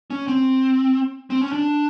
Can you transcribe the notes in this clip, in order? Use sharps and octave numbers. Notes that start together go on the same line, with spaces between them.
C#4
C4
C4
C#4
D4